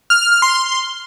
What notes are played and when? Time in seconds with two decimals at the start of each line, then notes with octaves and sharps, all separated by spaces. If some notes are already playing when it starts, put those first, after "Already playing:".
0.10 F6
0.21 F6
0.32 F6
0.42 C6